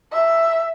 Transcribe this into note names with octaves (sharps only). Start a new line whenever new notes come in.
E5